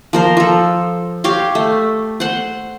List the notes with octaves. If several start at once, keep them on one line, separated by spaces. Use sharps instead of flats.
F3 A#4 C5
F3 A4
G4 C#5 F5 C6
A3
C5 F#5